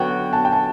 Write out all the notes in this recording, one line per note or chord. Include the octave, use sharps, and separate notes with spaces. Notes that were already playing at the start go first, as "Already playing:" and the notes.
Already playing: D3 F#3 B3 F#4 F#5 G5
A5
G5
A5